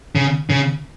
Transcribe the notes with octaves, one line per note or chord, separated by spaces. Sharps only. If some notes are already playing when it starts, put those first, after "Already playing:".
C#3
C#3